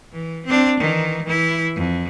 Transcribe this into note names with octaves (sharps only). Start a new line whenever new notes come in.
E3
C4 D4
D#3 E3
E3 E4
F2